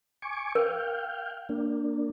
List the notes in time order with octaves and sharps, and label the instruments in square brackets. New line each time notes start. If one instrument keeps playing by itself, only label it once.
[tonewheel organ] G#5 C#6 D6
[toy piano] A#4 [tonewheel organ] F5 G5
[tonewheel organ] A#3 D4